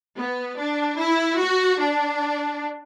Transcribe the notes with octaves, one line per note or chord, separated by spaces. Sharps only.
B3
D4
E4
F#4
D4